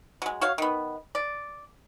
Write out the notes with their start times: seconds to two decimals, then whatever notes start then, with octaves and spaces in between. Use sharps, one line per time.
0.22 F#3 G#3
0.41 F#4 C#5 F5
0.58 D#3 B3
1.15 D5